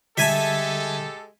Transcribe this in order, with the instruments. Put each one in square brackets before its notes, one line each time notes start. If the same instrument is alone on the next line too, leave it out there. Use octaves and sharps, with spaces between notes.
[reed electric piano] D3 G3 [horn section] G#3 G4 A4 [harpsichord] E5 G#5 A5